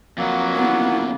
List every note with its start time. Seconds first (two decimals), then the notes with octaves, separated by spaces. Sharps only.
0.18 F2 F#3 A#3 B3
0.56 F2 C#3 B3 E4